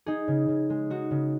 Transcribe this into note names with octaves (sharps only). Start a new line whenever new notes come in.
D#4 G#4
C#3
C#3
G#3
D#4 F#4
C#3